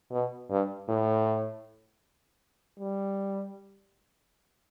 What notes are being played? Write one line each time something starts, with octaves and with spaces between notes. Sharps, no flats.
B2
G2
A2
G3